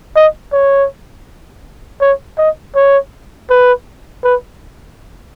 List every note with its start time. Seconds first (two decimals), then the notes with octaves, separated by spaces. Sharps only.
0.16 D#5
0.53 C#5
2.01 C#5
2.38 D#5
2.75 C#5
3.50 B4
4.24 B4